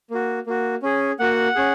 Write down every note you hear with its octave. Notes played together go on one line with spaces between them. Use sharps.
A#3 F#4
A#3 F#4
C#4 G#4
A#3 F#4 F#5
C#4 G#4